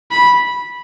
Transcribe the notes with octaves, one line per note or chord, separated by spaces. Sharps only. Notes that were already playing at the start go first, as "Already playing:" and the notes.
B5